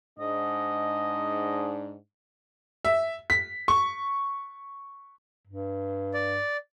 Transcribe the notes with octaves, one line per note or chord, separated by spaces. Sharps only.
G#2 D4 D#5
E5
B6
C#6
G2
D5